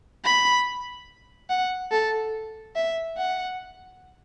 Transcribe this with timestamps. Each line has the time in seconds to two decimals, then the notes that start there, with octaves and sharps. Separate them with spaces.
0.25 B5
1.50 F#5
1.92 A4
2.75 E5
3.18 F#5